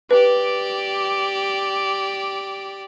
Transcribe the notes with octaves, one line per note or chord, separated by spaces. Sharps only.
G4 B4 D5